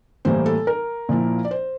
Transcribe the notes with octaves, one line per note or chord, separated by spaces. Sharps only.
A2 E3 G3 A#3 C5
A4
A#4
A#2 F3 A#3 E4
D5
C5